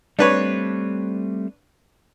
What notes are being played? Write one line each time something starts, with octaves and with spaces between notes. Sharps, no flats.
G3 A3 C4 D4 B4 C#5